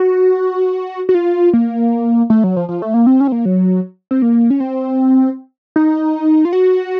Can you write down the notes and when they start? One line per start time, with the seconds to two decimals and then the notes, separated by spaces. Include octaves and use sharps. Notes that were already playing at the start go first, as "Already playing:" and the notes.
Already playing: F#4
1.09 F#4
1.14 F4
1.53 A#3
2.30 A3
2.44 F#3
2.56 F3
2.69 F3
2.82 A3
2.94 A#3
3.06 C4
3.20 C#4
3.28 C4
3.32 A#3
3.45 F#3
4.11 C4
4.22 A#3
4.50 C#4
4.60 C4
5.76 D#4
6.45 F4
6.53 F#4